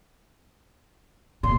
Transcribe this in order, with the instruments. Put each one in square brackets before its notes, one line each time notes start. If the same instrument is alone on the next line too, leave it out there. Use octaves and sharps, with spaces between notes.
[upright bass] A#2 [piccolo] C6